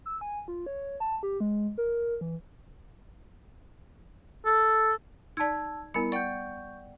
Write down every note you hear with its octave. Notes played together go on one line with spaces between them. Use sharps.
E6
G#5
F4
C#5
A5
G4
G#3
A#4
E3
A4
D#4 D5 A5 E6 G#6
G3 B3 E4 A#4 B5 C#7
D5 F#5 G5 C#6 G6